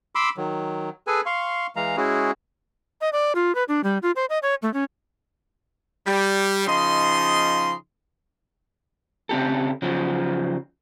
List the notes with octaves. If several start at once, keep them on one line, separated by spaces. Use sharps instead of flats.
B5 C6 D6 E6
D#3 F#3
G#4 A4 B4 G#5
F5 C6 C#6
E3 G#3 F5 A#5
G#3 C#4 E4 F#4 G#4
D#5
D5
F4
B4
D4
G3
F4
C5
D#5
C#5
A3
C#4
G3
C#3 F3 D#4 D#5 C6
C#3 C4 G4 A4
C#3 F3 F#3